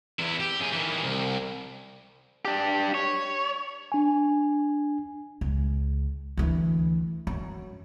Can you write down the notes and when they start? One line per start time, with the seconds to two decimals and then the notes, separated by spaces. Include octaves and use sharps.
0.19 E2 E4
0.40 G4
0.59 F#2 G#4
0.72 D#3 E3
1.04 C2
2.45 D4 G4
2.94 C#5
3.92 D4 G#5
5.41 C#2
6.37 D2 E3
7.27 F#2